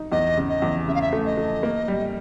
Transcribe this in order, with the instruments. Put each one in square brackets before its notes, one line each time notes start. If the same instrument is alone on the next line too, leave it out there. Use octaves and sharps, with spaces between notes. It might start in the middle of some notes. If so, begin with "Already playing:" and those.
Already playing: [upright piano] D#4
[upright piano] E2 [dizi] D#5
[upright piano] C#3
[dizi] D#5
[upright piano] E2
[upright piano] C#3 [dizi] E5
[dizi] F5
E5
[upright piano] A3
[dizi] D#5
[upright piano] A3
A#3
G3